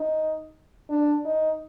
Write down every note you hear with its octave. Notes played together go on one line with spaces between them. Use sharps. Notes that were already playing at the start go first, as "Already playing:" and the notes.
Already playing: D#4
D4
D#4